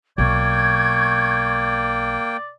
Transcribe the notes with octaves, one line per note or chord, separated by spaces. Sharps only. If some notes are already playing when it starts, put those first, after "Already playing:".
B1 A#3 D5 G5 C#6 G6 G#6